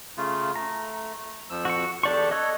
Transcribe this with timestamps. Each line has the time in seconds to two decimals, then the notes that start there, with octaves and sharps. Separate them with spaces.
0.17 C#3 A3 F4
0.56 A3 A#5
1.50 F2 F3 E6
1.65 F#4 C#6
2.03 E2 D4 G4 A4 D5 C#6
2.31 A4 C#5 D#5 F#6